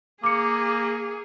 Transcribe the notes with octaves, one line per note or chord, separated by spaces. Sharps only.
A#3 G#4 D6 C#7